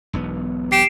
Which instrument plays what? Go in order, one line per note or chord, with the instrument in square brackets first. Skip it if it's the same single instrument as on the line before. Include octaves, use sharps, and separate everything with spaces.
[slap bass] E1 B1 B3
[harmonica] G4 [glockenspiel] C7 D7 E7